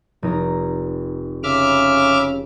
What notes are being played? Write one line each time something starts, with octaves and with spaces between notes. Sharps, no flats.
F1 D#4 A#5
C#3 E5 D6 F6